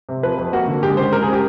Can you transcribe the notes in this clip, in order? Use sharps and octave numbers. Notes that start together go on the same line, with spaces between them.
C3
F3 B4
F2
A#3 F#4
D3
G#3 G4
C#3 C5
G#3 A#4
G#4
C#3
G4